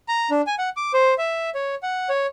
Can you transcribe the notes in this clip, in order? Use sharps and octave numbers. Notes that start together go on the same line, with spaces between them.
A#5
D4
G#5
F#5
D6
C5
E5
C#5
F#5
C#5